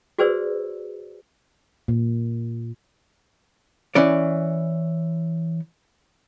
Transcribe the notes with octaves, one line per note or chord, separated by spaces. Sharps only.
F#4 G#4 B4 C5 D5 E6
A#2
E3 C#4 D5